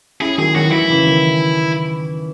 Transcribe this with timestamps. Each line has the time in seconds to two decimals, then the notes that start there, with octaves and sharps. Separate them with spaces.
0.21 C#4 E4 G#4
0.38 D#3 F#3 G#4
0.56 D#3 F#4
0.66 E3
0.72 D#3 E4
0.90 C#3 E3
1.06 D#3